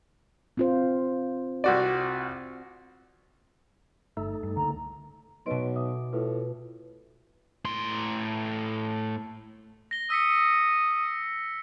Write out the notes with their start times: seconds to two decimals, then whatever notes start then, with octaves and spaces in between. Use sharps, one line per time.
0.57 C4 F4 C5
1.64 C2 F#4 D5
4.17 G1 A3 D#4 A4
4.43 G2
4.57 C#2 D3 A#3 A#5
5.46 B1 B2 B4 D#5 C6 D7
5.75 E5 D6 D#6
6.13 A2 F4 B4
7.65 A2 C6
9.91 A#6 G7
10.10 D#6 E6 B6 C#7